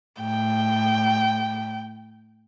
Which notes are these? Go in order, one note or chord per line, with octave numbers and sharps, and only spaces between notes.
A2 G5